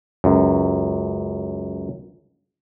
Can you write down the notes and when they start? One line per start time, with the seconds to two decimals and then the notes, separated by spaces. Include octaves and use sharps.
0.24 C#2 F#2